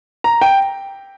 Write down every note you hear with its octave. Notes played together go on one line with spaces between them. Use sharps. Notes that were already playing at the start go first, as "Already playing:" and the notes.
A#5
G5